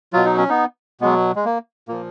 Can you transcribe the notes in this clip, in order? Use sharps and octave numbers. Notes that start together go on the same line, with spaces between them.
B2 F#3 F4
D#4
C#4
B3 D#4
B2 F#3 G#3 B3
G#3
A#3
A#2 F3 A#3